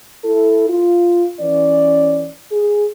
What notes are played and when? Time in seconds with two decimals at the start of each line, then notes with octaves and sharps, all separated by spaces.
0.24 E4 A4
0.68 F4
1.39 E3 C#4 D5
2.51 G#4